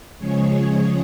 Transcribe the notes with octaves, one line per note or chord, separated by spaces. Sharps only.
C#3 F3 G#3 G#4 C#5